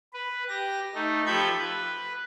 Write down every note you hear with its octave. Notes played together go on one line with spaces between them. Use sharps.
B4
G4 A#6
A3 D#4
F3 G4 A4 B5 G6 G#6
B4